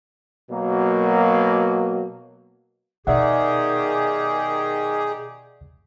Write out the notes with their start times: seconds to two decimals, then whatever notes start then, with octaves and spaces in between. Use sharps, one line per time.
0.50 B2 F#3 A#3
3.07 B2 D#3 G4 G#4 D5 E5 F#5